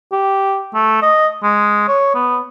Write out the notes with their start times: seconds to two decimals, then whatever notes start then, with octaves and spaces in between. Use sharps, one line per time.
0.12 G4
0.74 A3
1.02 D#5
1.43 G#3
1.88 C#5
2.14 B3